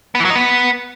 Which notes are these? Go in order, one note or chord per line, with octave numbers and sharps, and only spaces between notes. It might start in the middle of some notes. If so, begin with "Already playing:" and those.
B3
E3
F#3
D#4
B3